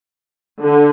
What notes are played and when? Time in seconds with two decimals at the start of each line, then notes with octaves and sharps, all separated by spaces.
0.62 D3